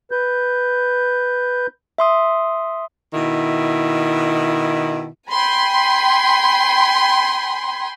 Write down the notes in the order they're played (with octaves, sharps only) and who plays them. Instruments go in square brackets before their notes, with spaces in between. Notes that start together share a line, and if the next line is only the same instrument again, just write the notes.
[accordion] B4 G6
[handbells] E5 C6 D#6
[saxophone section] B2 D#3 E4
[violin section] G5 G#5 B5 C6